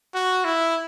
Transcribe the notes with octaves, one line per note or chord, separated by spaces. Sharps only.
F#4
E4